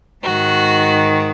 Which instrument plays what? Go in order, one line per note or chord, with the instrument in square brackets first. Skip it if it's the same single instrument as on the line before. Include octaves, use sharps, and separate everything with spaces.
[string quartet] G#2 D#3 F#4